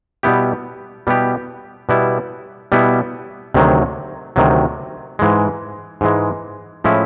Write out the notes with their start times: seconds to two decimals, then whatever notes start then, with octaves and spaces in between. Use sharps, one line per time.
0.23 B2 G3 B3 E4 G4
1.07 B2 G3 B3 E4 G4
1.89 B2 G3 B3 E4
2.72 B2 G3 B3 E4
3.54 D2 C3 D#3 F#3
4.36 D2 C3 D#3 F#3
5.19 G#2 E3 G#3
6.01 G#2 E3 G#3
6.84 A2 F3 G#3 C#4 E4